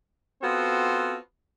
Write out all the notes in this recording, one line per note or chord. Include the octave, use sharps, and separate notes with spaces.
B3 C4 F4 F#4 A4 C5